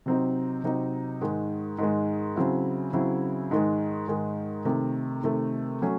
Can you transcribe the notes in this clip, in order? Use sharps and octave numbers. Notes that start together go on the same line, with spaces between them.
C3 F#3 C4 D#4
C3 F#3 C4 D#4
G#2 D#3 G#3
G#2 D#3 G#3
C#3 F#3 C4 E4
C#3 F#3 C4 E4
G#2 D#3 G#3
G#2 D#3 G#3
C3 D#3 A3
C3 D#3 A3
F#3 A3 C#4